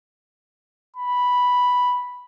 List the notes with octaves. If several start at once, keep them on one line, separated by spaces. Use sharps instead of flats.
B5